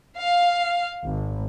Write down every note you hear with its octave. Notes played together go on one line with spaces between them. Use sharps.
F5
G#1